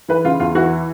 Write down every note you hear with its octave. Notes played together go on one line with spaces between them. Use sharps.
E3 B4
C#3 F4
E2 F4
E3 F#4